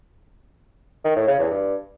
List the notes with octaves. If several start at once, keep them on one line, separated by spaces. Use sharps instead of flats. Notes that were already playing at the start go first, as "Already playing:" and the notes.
D#3
A2
C#3
E2
G2